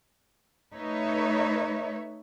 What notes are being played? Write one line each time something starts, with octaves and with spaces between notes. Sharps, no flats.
A3 D#4 B4 C#5 E5